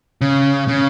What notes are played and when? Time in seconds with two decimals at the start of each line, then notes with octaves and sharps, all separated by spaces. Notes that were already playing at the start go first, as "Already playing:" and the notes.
0.21 C#3
0.68 C#3